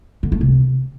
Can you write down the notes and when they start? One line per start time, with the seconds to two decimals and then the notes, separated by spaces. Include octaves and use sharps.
0.23 D3
0.32 A3
0.41 C3